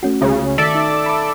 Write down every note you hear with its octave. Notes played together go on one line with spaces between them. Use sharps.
A3 C#4 F#4
C#2 C#3
D#3 A4 D5 E5
D#4
B5 D6